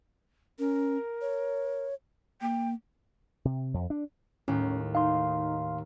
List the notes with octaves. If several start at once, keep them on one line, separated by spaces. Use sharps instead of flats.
C#4 A#4
C#5
A#3 G5
C3
F2
D4
D#2 A2 C#4
D#4 F5 C6